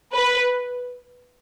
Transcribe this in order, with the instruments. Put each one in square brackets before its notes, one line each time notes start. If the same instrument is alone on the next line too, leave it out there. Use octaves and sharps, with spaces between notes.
[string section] B4